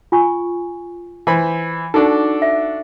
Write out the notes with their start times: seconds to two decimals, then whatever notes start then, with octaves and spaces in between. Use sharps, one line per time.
0.12 F4 G#5 C#6
1.27 E3 C5 B5
1.94 D4 D#4 F#4 A4 D6
2.42 E5